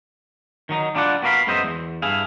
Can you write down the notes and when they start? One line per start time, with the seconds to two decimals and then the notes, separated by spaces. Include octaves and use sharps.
0.69 D#3 F#3 D#4
0.95 G3 D4 F4 D5 F#5
1.23 B3 F#4 A#4 D#5 F5 B5
1.47 F#2 G#3 B3 C5 D#5 E5
1.63 E2
2.02 G2 E4 G#4 F5